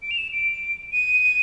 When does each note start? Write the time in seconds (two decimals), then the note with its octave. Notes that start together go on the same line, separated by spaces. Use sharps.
0.02 D7
0.11 F7
0.18 E7
0.32 D7
0.92 D#7